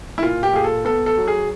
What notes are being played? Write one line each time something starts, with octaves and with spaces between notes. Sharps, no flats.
E4
A#2 F4
G4
A#2 G#4
A4
B3 A4
A4
F#3
G#4